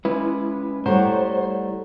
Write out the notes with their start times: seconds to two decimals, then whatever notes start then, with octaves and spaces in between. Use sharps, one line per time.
0.05 G#3 C#4 E4 B4
0.86 G3 A3 E4 C5 C#5 F#5 A#5